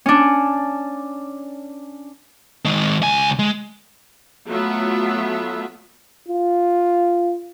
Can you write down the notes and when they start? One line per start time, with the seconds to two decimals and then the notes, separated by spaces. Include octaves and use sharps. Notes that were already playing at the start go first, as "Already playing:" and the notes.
0.06 C#4 D4
2.65 D#3 G#3
3.03 C#2 G#5
3.39 G#3
4.48 F#3 A3 B3 F4 E5
6.28 F4